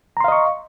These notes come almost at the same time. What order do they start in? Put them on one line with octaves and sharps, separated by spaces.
A#5 C6 F5 D#5 C#6